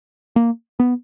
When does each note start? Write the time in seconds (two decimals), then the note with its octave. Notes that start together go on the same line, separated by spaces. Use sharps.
0.36 A#3
0.80 B3